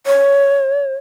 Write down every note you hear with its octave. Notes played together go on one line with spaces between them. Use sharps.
C#5